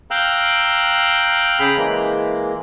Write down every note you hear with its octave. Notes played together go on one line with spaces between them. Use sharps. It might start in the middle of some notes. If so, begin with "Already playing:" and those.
F5 G5 A#5 E6 F#6 G6
C#3 G#4 G5 A#5 B5
E3 G#3 A#3